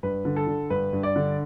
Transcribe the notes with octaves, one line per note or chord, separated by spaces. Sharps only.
G2 B4
D3
A4
D3
G2 B4
G2
D5
D3